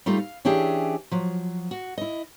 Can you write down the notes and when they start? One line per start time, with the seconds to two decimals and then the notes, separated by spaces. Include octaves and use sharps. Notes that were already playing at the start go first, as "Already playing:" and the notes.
0.06 G3 A3 D#4 F4
0.18 F5
0.45 E3 C#4 D4 G4 G#4 E5
1.12 F3 F#3
1.71 F#4
1.98 E4 D#5